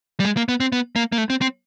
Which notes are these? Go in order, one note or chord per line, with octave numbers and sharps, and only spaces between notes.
G3
G#3
A#3
B3
C4
B3
A#3
A#3
A3
C4
C4